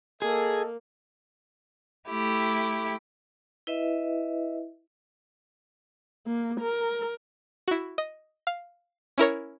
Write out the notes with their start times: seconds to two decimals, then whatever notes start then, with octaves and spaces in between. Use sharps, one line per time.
0.22 A#3 G#4 A4 D#5
2.08 A3 E4 G4
3.67 E4 B4 D#5 E5
6.26 A#3
6.60 A#4
7.68 E4 F#4
7.98 D#5
8.47 F5
9.18 C#4 E4 A#4 C#5